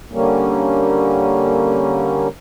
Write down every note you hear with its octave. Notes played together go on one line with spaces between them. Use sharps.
D3 G3 A#3 C#4